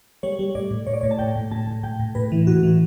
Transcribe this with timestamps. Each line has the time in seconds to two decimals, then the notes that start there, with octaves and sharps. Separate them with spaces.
0.23 G3 C#5
0.39 G3
0.55 A2 D5
0.71 A2
0.87 A2 C#5
0.94 D5
1.01 A2 C#5
1.11 A5
1.19 A2 G5
1.35 A2
1.51 A2 A5
1.67 A2
1.83 A2 G5
1.99 A2
2.15 A2 B4
2.32 E3
2.47 A2 F#4
2.63 E3